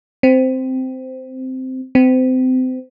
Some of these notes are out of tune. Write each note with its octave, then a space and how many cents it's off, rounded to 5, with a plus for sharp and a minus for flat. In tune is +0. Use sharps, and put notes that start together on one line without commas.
C4 -10
C4 -30